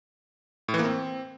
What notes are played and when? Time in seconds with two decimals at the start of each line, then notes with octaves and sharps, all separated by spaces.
0.68 A2
0.74 E3
0.79 A#3
0.85 C4